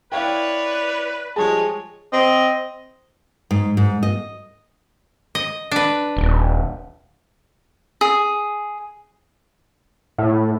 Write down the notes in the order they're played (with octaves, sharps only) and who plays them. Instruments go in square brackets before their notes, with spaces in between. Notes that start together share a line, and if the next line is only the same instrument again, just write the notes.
[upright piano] E4 F5 G5 [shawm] B4 [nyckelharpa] C#5 D5
[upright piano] F3 G3 A5 [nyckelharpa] G#3 C#5 [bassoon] G#4
[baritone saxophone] C4 [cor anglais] D#5
[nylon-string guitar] G#2
G#2
D#5
[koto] D#5
D4 B4
[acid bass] D#1
[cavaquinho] G#4
[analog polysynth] A2